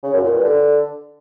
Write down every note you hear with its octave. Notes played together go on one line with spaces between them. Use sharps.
C#3
F#2
A#2
G2
D3